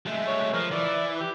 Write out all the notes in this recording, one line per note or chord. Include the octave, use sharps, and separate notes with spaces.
G#3 A3
C#5
F3 A#4
E3 D5
G4